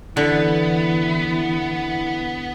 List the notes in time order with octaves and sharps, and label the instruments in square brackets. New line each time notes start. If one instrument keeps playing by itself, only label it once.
[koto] D3 [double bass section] E3 [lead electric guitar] B3 [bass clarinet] E4